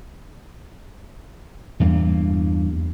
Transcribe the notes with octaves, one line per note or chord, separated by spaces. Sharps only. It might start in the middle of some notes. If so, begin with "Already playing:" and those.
E2 G2 A#3